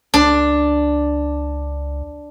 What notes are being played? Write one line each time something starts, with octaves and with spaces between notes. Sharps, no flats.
C#2 D4